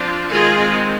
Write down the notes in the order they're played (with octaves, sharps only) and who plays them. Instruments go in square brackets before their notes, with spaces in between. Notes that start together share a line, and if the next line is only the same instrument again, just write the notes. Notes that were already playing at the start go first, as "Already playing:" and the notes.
Already playing: [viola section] F3 C4 D4 F4
D#3 G#3 C4 F4 G#4